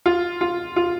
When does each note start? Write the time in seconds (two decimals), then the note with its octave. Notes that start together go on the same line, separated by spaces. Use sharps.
0.06 F4
0.41 F4
0.76 F4